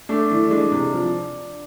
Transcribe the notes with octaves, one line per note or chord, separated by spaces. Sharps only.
A3 D4
E3
G#3 D4
C3
F3